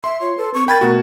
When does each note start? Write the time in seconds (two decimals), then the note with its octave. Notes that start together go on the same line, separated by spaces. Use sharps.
0.04 E5 C6
0.21 F4 C#5
0.37 A4 B4
0.54 C4 C#6
0.68 A#4 G5 B5 G#6 A6
0.81 B2 A3 F#4 A#4